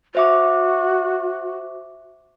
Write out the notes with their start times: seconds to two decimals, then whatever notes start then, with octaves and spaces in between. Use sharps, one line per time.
0.15 F#4 C5 E5 D6